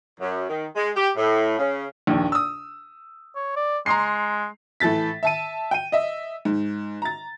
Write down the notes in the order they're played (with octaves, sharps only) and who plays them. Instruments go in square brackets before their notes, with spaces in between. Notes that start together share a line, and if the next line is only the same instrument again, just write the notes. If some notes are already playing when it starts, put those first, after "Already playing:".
[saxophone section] F#2
D#3
G#3
G4
A2
C#3
[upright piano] A#1 D#2
D#6 E6
[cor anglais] C#5
D5
[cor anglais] G#3 [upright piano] A#5 C6 C7
[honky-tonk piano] A2 E3 A4 A6 B6
E5 A5 D#7
G5 D#7
D#5 E5
G#2
A#5 A6